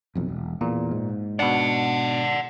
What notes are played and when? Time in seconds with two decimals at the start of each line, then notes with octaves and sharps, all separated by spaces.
0.15 F1 B1 F2
0.29 E1
0.61 E2 A#2
0.91 G#2
1.39 B2 D4 D5 F#5